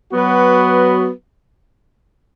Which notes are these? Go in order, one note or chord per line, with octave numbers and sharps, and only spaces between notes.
F#3 B3 F#4 B4